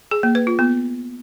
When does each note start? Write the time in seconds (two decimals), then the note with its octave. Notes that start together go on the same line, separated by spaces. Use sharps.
0.11 G#4
0.23 A#3
0.35 B4
0.47 F4
0.59 B3